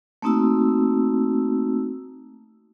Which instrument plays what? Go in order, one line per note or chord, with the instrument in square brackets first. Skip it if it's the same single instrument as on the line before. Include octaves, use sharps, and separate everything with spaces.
[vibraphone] A3 A#3 C4 D#4 F#4 E6